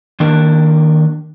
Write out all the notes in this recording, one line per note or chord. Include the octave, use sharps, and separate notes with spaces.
D#3 A#3 D4 A#4